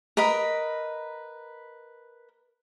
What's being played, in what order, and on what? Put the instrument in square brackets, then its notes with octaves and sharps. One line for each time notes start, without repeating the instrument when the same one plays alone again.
[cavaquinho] A#4 B4 D#5 B5